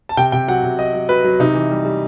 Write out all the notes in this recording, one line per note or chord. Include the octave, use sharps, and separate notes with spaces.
A5
C3 G5
C3 G5
F#3 F#5
C3
F#3 D#5
F#3
F#3 B4
F#3
C3 D#4
E3
G3
G3